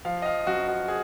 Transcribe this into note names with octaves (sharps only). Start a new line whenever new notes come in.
F3 F5
D#5
F5
F#2 F#4
F#4
G#4